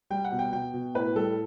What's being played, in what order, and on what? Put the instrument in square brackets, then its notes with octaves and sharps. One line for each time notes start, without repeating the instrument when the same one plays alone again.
[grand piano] G3 G5
F#5
B2
G5
B2 G5
B2
A2 B4
G3 A4